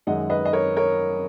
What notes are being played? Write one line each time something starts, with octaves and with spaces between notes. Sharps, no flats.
F#2 D#3 G#3 D#4 D#5 F#5
B4 D#5
D#5
A#4 C#5
A#4 C#5